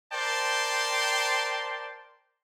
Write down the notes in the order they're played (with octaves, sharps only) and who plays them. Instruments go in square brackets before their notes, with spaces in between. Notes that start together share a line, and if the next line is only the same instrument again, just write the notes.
[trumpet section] A#4 C5 D5 G5 A5 C6